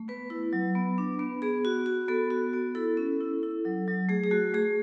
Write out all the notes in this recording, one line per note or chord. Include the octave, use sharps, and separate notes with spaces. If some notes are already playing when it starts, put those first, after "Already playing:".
Already playing: A3
B3 B4
E4
F#3
B3
D4
B3
B3 G#4
F#4
F#4
B3 A4
F#4
B3
E4 A4
C#4
E4
E4
F#3
F#3
A3 G#4
G#4
A3 F#4
A3 G#4